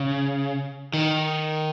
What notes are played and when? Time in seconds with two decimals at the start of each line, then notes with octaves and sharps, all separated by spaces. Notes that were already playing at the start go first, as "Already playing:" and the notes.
Already playing: C#3
0.94 D#3